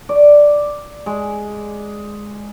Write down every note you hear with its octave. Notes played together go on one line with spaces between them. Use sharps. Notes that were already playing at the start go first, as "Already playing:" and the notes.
D5
G#3